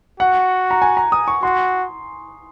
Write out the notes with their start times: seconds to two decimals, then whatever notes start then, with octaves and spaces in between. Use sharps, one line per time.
0.20 F#4 F#5
0.71 A#5
0.82 G#5
0.97 A#5
1.12 D#6
1.28 C#6
1.43 F#4 C6